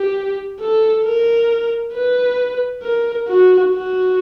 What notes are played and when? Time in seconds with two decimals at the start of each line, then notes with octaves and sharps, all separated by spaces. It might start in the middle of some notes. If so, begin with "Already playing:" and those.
Already playing: G4
0.60 A4
1.05 A#4
1.94 B4
2.83 A#4
3.28 F#4
3.72 F#4